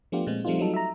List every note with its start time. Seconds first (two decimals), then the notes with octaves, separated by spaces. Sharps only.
0.12 F3 A3 B3 D4 F4 G4
0.27 A#2 G#3 C4
0.45 F3 G3 A3 C4 D#4 F4
0.59 F#3 G3 D#4 A4
0.74 E5 A#5